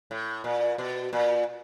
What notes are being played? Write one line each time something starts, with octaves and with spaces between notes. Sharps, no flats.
A2
A#2
B2
A#2